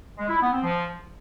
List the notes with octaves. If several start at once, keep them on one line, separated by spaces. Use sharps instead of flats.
G#3
E4
B3
C4
F3